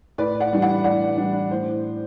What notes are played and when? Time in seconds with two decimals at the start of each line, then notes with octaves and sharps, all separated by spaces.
0.18 A2 B4 D5
0.40 D5 F#5
0.51 E3 G3 D4
0.62 D5 F#5
0.84 A2 D5 F#5
1.18 E3 G3 D4
1.51 A2 C5